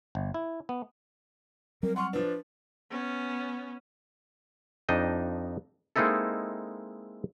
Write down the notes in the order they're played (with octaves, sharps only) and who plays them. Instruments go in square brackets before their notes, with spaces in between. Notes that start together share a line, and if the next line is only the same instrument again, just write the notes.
[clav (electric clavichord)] G1
E4
B3
[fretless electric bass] F#3 G3 C4 [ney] A#4
[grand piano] F#5 C#6 F6 [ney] C6
[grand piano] F3 D4 [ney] B4
[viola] B3 C#4
[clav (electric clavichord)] F2 D4 D#4 D#5 G5
G#3 A#3 C4 D#4 E4 A4